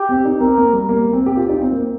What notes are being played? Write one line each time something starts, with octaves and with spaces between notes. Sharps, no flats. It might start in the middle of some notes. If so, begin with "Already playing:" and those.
Already playing: G4
C4
D#4
C4 A#4
A#3
G3
A#3
C4
G4
F4
D#4
C4
A#3